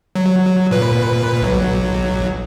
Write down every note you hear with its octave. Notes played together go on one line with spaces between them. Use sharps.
F#3
A#2 B4
B1 F#3